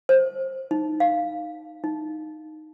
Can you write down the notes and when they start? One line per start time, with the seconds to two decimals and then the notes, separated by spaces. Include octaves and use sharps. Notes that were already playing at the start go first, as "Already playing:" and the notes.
0.09 C5
0.71 D#4
1.00 F5
1.84 D#4